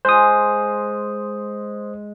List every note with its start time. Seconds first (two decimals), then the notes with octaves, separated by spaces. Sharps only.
0.05 G#3 C5 D#6